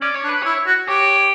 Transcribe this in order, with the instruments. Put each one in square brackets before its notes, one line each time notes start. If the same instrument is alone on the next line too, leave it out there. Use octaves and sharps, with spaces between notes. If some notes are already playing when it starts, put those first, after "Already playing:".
[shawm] C#4 [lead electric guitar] D5
[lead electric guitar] C#5
[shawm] D4
[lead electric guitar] B4
[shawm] E4 [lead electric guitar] C#5
[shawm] F#4
[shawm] G4 [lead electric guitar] C#5